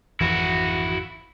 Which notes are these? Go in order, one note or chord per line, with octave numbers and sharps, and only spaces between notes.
G#1 F2 E3 E4 F#4